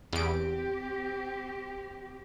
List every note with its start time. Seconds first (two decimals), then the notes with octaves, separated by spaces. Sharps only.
0.13 E2 C4 G4 D7